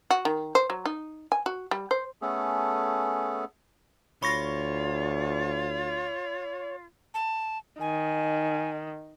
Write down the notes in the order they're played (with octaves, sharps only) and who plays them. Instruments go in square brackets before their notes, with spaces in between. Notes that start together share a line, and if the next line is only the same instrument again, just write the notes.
[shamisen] F#4
D#3
C5
F#3
D#4
G#5
F#4
G3
C5
[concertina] A3 B3 C#4 G#4 A4
[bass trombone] D2 [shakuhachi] F4 [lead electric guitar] C#5 [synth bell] B5 C#6 A#6
[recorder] A5
[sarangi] D#3 [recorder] G#5